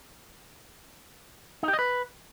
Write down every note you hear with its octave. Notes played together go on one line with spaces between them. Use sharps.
D#4
G4
D#5
B4